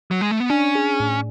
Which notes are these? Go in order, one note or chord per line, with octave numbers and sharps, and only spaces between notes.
F#3
G#3
A3
B3
C#4 D4
G#4
A2